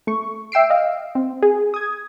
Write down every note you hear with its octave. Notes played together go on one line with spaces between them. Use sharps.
A3 C#6
E5 G5 E6 C7 D7
D#5 F5
C4
G#4
D#6 G#6